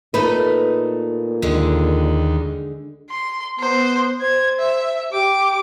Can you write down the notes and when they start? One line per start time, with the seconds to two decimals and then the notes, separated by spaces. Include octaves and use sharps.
0.14 A#2 A3 D#4 B4
1.42 D#2 D3 G#3
3.10 C6
3.60 B3 C5
4.21 C5 G#6
4.59 E5
5.13 G4 D6